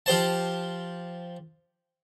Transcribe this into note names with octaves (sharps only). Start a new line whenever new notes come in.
F3 G4 C5 A5